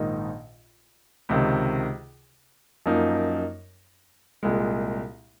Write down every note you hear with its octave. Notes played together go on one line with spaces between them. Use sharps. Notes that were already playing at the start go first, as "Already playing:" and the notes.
Already playing: A#1 G#2 D#3 A#3 D#4
C#2 C3 D#3
F#2 F3 A#3 D#4
C2 A#2 G#3